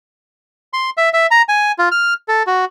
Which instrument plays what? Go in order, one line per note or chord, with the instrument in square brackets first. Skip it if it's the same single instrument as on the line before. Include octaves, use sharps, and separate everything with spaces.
[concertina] C6
E5
E5
A#5
G#5
F4
F6
A4
F#4